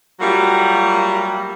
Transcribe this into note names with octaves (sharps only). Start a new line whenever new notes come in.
F#3 G3 A3 A#3 F4 F#4